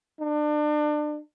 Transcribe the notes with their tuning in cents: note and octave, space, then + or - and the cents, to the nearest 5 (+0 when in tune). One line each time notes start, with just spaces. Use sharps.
D4 +30